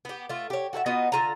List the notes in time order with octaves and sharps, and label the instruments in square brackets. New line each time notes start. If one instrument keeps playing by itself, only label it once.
[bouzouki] B3 G4
A3 F4
G4 C#5
F#4 A4 C5 E5
B3 D#4 F4 F#4
D3 F4 A#5